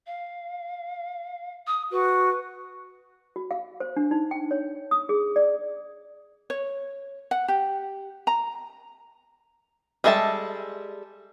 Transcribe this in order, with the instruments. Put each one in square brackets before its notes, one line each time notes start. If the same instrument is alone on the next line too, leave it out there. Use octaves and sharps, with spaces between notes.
[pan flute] F5
D#6
[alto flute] F#4 [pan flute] B4
[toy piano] F#4
F5
C5
D4
D#4
G5
C#5
D#6
G#4
D5
[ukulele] C#5
F#5
G4
A#5
[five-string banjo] G3 G#3 A4 E5 A5